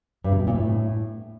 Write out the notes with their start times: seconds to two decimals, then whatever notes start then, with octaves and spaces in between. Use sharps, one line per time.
0.24 G2
0.32 C3
0.40 B2
0.47 A#2
0.55 A2